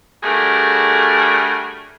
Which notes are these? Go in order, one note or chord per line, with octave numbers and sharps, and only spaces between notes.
G3 A3 D4 F#4 G#4 A#4